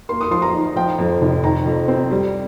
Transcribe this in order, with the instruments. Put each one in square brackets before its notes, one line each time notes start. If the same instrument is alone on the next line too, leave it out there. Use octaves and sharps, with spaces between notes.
[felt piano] A#3 C6
D#6
F3 C6
A#5
D#4
F3 G5
F2
F1
D#3 A#5
F2
C4
G3